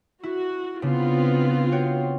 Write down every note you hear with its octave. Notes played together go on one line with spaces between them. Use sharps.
E4 F#4
C#3 B3 C4 D4 F4
F#4 C#5 G5